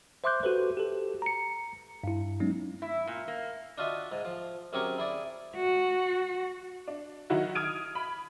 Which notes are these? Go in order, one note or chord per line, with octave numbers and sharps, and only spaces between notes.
C5 E5 C6 D6 F#6 G6
F#4 G4 A4 B4 C5
G4 A4
A#5 C#7
G2 E4
F#3 G#3 B3 C#4 D#4
E4
A#2
A#3
D4 F4 F#4 D#5 E5
G#2
F3
F#2 C4 G4 G#4 A#4 C#6
E4 G#4 D5
F#4
D4
D#3 F#3 D#4 E4 F#4
D#6 F6 G#6 D7 D#7
B5